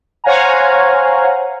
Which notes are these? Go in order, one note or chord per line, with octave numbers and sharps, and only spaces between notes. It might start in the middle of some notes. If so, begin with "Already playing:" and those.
C5 C#5 F5 F#5 G#5 A#5